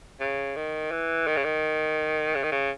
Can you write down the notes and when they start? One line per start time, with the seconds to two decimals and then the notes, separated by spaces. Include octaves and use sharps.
0.21 C#3
0.56 D#3
0.91 E3
1.27 D#3
1.36 C#3
1.44 D#3
2.35 C#3
2.43 D#3
2.52 C#3